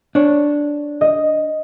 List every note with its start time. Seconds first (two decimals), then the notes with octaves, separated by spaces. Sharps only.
0.15 D4 C#5
1.01 D#5